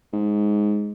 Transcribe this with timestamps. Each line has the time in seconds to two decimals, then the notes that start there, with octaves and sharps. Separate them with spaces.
0.13 G#2